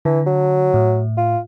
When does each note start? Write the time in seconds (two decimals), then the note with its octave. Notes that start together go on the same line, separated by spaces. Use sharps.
0.05 D3 E3
0.26 F#3
0.74 A2
1.17 F4